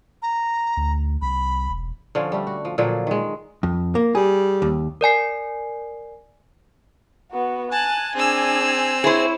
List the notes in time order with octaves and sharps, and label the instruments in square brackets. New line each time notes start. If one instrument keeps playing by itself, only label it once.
[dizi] A#5
[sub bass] D2
[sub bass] C2 [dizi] B5
[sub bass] E1
[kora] D3 F3 C#4
G3 A3
F#4
F3
A#2 D3 F3 F#3
D#3 G#3
[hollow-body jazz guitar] F2
A#3
[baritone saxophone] G3 [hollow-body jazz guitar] G#4
[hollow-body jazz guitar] D#2
[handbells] A#4 D5 G#5 C7
[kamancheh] B3 F#4
[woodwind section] G#5 [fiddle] A5 [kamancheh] F#6
[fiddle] C4 E6 [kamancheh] D4 G#4
[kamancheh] E4 C#5 [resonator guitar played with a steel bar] G#4 C5